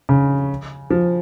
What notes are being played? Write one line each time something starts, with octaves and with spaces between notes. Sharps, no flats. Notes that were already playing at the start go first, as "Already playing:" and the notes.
C#3
F3